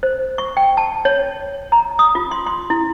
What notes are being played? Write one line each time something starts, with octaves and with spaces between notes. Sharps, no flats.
C5
C#6
G5
A5
C#5
A#5
D#6
F4
C6
C6
E4